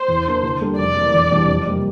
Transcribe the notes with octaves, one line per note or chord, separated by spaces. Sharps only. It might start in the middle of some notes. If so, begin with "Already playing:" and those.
Already playing: C5
E2
E3 A#3 D4
D3
G3 A#3 D4 A4
F1 D5
F2 E3 A#3
E1
E2 C3 G3 D4
F2
C3 G3 A#3